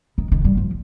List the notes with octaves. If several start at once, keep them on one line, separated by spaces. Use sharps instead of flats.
D#3
D#3
G3
F3